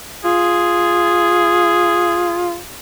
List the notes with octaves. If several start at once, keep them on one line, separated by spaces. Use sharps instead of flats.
F4 G#4